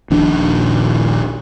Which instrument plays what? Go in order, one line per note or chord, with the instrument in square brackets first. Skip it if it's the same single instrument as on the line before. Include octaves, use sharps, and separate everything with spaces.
[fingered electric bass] D#1 A#1 D#3 D4